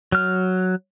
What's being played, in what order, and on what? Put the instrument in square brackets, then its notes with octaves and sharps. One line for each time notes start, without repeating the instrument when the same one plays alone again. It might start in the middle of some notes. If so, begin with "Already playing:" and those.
[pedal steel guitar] F#3 F6